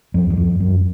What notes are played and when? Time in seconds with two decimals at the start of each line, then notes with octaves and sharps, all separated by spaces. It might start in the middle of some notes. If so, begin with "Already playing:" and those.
0.14 F2
0.30 E2
0.37 F2
0.60 F#2